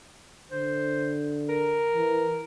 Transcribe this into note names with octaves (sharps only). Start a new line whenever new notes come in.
D3 C5
A#4
E3